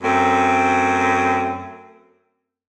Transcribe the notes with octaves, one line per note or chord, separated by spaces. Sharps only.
F#2 A3 C4